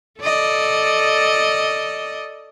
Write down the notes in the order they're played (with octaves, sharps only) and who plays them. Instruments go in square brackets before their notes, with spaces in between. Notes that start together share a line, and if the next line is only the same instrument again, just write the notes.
[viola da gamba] A4 D5 D#5